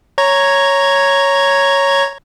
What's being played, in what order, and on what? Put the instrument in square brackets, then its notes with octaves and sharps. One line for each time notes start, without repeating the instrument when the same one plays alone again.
[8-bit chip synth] C#5 A#5 G#6